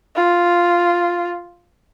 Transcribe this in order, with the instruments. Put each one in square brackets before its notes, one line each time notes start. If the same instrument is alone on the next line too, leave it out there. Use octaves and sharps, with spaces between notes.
[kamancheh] F4